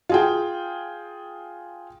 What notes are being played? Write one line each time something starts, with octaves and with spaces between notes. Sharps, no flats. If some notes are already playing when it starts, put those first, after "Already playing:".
F4 G#4 G5